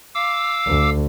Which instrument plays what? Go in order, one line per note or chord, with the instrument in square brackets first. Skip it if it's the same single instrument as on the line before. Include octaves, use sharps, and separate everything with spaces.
[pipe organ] F5 D6 E6
[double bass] D2